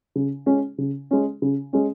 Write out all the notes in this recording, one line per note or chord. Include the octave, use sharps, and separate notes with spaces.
C#3
G#3 C#4
C#3
G#3 C#4
C#3
G#3 C#4